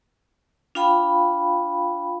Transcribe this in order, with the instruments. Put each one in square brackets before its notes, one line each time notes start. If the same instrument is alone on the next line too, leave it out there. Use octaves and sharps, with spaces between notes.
[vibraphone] D4 F4 F5 G5 B5